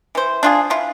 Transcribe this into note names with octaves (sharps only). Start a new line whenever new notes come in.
E3 C5
D4 F4 G#4
E4 F4